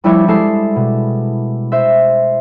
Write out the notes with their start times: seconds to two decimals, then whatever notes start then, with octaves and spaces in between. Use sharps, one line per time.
0.04 F3 G3 A3 E4 G4 C#5
0.28 G#3 E4 A4 A5 D6 C7
0.76 B2
1.72 C5 E5